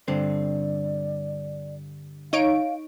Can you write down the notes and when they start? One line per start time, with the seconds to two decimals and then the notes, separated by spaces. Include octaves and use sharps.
0.08 G2 D3 C4 D5
2.33 D#4 C#5 F5 D7